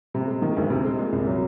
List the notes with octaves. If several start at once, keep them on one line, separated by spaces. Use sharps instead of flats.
C3
G#3
D#3
D2
C3
G#3
A#2
C2
F#3